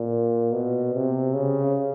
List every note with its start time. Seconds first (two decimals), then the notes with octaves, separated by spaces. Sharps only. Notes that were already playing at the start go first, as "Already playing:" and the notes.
Already playing: A#2
0.52 B2
0.93 C3
1.34 C#3